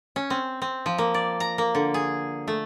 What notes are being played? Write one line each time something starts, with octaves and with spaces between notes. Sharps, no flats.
C#4
C4
C4
F3
A#3
D5
A#5
A#3
D3
G#4
A3